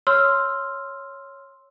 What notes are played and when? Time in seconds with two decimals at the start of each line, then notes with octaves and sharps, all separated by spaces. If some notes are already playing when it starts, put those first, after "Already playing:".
0.07 C#5 C6 E6 F6